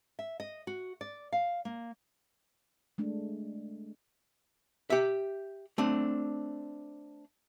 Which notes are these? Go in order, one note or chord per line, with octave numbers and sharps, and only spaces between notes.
E5
D#5
F#4
D5
F5
A#3
G#3 A3 D4
G4 E5
A3 C4 D4